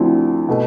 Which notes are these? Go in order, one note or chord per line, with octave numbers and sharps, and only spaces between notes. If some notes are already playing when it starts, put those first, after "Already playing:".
Already playing: D2 D3 F3 C4 E4
B2 A3